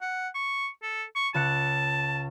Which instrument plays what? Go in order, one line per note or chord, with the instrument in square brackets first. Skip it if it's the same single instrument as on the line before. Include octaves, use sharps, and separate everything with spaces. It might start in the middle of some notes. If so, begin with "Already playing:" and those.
[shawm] F#5
C#6
A4
C#6
[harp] C#2 F#6 C#7 [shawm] A5